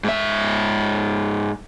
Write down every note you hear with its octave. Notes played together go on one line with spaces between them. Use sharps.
G#2 E5